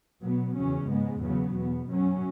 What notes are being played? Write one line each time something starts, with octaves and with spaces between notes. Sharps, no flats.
B2 F#3 B3
E2 C#3 F#3 C#4
G#2 G#3 B3
E2 C#3 F#3 B3
E2 B2 B3
F#2 F#3 C#4